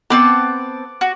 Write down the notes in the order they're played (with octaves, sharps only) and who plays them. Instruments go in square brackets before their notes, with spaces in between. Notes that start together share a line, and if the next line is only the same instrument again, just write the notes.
[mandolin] B3 C4 A5 [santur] D6
[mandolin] F#4